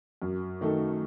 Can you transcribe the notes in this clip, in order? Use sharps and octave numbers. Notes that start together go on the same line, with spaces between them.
F#2
D#3 A3 D#4 A4